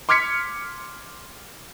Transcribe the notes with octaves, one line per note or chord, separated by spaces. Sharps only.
C6 D6 F6 G#6 B6 C#7